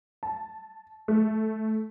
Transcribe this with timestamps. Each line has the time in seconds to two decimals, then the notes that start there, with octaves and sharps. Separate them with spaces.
0.23 A5
1.08 A3